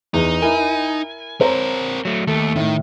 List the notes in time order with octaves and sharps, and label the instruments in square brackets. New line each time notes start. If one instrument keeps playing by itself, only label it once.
[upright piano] E2 [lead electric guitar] D#4
[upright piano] E4 A#4 [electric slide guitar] G#5
[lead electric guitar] C4 A#4 [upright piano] C5 C#5 A#5
[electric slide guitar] F#3 A3
[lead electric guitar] D#2 [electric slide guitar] A3 [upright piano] A4
[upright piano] A2 [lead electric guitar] D#3